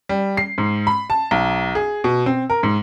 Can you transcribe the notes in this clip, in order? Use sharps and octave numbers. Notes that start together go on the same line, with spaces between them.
G3
C7
G#2
B5
A5
B1
G#4
B2
C4
A#4
G#2